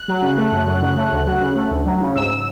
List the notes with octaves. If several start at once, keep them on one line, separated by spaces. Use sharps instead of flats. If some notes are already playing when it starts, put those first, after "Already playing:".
Already playing: F#6
F#3
C#3
A3
F#2
F#3
C#3
A3
D2
F#3
C#3
A3
D2
F#3
C#3
G#2 E6